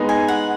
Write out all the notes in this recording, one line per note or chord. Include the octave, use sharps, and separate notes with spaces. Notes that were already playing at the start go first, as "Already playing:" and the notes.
Already playing: G#3 B3 D#4
G#5
F#5